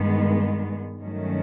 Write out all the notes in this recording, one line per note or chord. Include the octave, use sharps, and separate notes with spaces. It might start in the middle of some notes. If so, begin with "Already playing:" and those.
Already playing: G2 D#3 G#3 B3
G2 D#3 F#3 A3 C#4